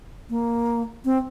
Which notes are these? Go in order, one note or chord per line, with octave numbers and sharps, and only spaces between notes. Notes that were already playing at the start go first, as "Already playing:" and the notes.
A#3
C4